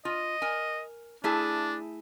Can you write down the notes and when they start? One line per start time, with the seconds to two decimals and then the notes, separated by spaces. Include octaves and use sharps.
0.05 F4 D#5
0.42 A#4 G#5
1.24 A3 D4 E4 G#4